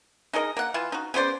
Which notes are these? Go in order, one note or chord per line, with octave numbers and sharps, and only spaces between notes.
D#4 G#4 A#4 D#5
A#3 F#5
E3 E4 F4
D#4 F#4
C#3 B3 C5 D5